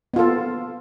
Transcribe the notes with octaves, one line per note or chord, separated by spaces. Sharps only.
B3 F4 A4